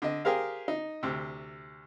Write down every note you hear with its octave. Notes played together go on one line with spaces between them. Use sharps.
D3 D#5
G4 G#4 A#4 C5 F5
D#4
D2 C3